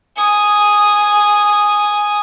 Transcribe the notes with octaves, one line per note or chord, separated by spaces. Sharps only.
G#5 D#6